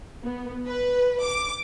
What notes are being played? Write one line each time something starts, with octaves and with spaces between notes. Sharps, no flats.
B3
B4
D6